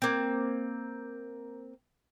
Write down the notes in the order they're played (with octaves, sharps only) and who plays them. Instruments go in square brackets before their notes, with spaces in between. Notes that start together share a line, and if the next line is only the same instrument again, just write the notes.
[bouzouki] A#3 C4